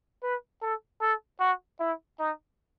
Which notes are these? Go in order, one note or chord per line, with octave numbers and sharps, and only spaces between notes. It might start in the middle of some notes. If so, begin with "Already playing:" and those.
B4
A4
A4
F#4
E4
D#4